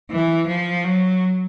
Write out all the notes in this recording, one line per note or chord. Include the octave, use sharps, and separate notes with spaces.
E3
F3
F#3